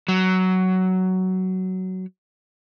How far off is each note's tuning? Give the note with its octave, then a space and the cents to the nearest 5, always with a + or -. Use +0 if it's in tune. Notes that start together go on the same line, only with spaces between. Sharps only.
F#3 +10